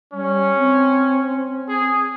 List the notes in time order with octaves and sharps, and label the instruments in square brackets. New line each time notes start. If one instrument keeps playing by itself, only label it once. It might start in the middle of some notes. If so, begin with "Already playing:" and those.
[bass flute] G3 [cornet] C#4
[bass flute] C4
[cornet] G#4